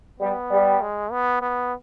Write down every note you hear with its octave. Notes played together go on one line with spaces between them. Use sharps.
G3 B3
G3
G#3
B3
B3